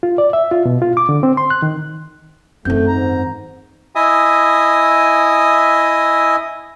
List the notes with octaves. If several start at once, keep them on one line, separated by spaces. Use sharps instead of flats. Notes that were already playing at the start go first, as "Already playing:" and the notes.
F4
D5
E5
F4
B2
F4
D6
D3
C4
C6
F#6
D#3
F#2 D#3 A3 C4 G6
G#2 A#5
E4 D#5 E5 G#5 D#6